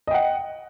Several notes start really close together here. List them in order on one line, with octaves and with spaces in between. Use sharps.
D#5 G5 F#5